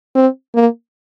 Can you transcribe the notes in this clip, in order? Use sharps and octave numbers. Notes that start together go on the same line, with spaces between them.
C4
A#3